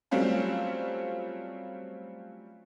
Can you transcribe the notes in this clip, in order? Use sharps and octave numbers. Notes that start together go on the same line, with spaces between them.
F#3 G3 A3 C4 C#4 F4